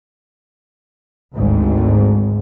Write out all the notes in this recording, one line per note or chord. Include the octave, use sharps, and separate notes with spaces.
G#1 D2 G#2